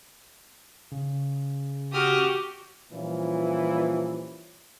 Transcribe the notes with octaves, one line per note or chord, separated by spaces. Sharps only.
C#3
F#4 G4 D#6 F6
A#2 E3 F3 G3 C#4